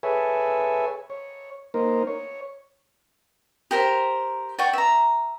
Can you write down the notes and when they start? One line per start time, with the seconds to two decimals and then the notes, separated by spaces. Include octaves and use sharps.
0.03 G#4 A4 B4 C#5 E5 G#5
1.10 C#5
1.74 A#3 D#4 A#4 C5
2.07 C#5
3.71 G4 A#4 C5
4.59 D5 F#5 G5 C#6
4.73 E5 A#5